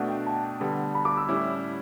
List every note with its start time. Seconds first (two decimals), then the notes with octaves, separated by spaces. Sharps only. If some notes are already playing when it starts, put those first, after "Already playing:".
Already playing: B2 A3 D4 F#5
0.09 G5
0.26 A5
0.60 D3 G3 B3
0.95 B5
1.05 D6
1.17 E6
1.29 A2 G3 C#4 E4